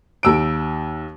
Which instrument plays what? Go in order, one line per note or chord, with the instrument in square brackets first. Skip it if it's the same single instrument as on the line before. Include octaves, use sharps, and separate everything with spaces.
[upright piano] D#2 E6 D7